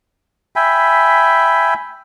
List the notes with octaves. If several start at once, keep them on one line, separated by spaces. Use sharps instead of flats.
E5 G5 G#5 B5